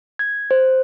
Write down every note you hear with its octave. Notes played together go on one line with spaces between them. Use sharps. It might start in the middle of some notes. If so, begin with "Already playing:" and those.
G#6
C5